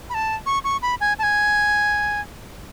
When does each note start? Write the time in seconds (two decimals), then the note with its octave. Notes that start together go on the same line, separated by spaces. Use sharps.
0.10 B5
0.14 A5
0.46 C#6
0.64 C#6
0.82 B5
1.01 G#5
1.19 A5
1.23 G#5